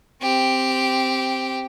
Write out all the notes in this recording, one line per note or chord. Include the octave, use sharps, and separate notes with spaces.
C4 G4